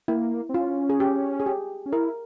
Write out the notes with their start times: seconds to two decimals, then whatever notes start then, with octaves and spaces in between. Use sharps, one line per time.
0.08 A#3 E4
0.49 C4
0.54 C#4 F4
0.90 G#4
1.00 G4
1.40 G#4
1.46 G4
1.86 C#4
1.93 E4 A#4